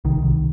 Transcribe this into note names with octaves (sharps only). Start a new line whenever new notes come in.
C2 D#3
C2